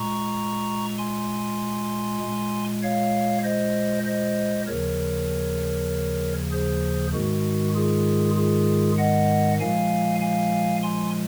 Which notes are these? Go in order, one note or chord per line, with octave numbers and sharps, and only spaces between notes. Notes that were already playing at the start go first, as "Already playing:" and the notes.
Already playing: A#2 G#3 A#5 C#6
G#5 C6
A#2 G#3
C#5 F5
C5 D#5
C5 D#5
D#2 C#3 F3 A#4 C#5
G#4 C5
G#2 D#3 G#3 F#4
F4 G#4
F4 G#4
D#5 F#5
A#2 F3 G#3 F5 G#5
F5 G#5
G#5 C6